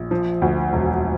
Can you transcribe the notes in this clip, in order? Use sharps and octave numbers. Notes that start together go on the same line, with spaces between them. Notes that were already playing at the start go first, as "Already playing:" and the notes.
Already playing: A#1
F3
D2
E1